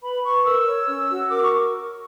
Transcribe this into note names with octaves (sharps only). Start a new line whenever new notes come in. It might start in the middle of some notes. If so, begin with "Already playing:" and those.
B4 B5
B4 C#6
A#4 E6
C#5
C#4
F#4
A#4 D6
C#6